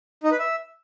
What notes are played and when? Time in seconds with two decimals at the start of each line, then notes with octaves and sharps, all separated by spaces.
0.23 D#4
0.31 B4
0.39 E5